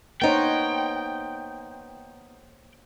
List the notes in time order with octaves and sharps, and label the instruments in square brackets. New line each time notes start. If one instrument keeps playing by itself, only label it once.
[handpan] A#3 C5 C#5 [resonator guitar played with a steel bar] B3 D#4 [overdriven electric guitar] G5